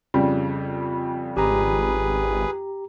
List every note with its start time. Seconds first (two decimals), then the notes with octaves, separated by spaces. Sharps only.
0.14 F2 C#3 G3
1.37 G#1 G4 G#4 B4 A#5